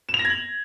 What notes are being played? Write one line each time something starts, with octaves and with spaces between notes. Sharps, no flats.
E7
F7
A#6
G#6
F#7